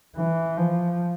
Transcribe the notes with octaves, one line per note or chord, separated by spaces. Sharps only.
E3
F3